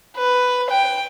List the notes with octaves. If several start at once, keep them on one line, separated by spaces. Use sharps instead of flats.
B4
G5